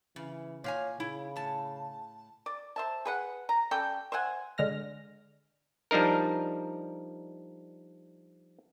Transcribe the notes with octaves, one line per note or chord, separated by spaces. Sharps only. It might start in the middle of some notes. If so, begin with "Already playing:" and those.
C#3 E3
A#2 C#5 F5 G#5
C#3 E4
A2 A5
D5
C5 E5 A5
G#4 B4 F#5
A#5
G3 C#4 A4 G5
C5 E5 F#5 G#5
D3 G#3 F6 A#6
F3 G3 D4 D#4 A#4